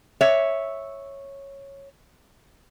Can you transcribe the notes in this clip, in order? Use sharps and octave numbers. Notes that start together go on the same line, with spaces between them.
C#5 E5